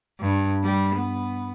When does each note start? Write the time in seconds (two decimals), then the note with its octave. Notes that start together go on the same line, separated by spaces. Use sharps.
0.20 G2
0.63 G3
0.95 B3